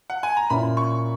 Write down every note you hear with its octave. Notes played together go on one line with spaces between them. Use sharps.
F#5
G#5
A#5
A#2 A#3 C#4 E4 B5
C#6